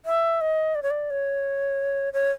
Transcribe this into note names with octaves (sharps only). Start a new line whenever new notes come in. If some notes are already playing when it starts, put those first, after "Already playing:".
E5
D#5
D5
C#5
D5
C#5
C#5